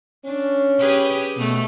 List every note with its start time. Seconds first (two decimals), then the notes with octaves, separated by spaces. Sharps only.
0.25 C#4 D4
0.78 G4 G#4 B4
1.36 B2 A3